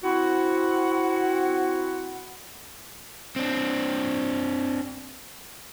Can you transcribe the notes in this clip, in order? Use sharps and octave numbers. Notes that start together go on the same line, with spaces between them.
C4 E4 F#4 F#5
C4 D4